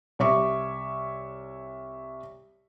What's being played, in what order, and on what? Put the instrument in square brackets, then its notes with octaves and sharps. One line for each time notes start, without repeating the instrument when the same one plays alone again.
[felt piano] C2 C#5 E5 C#6 D6